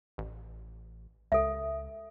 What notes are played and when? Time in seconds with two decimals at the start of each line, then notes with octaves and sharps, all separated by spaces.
0.18 A1
1.32 C#2 A4 E5